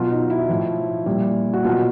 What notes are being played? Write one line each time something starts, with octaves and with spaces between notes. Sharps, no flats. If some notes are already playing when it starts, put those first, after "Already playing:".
Already playing: B2 F#3 F4
D#4
E4
A2 F3
A#2 G3
F#4
B2 F#3 F4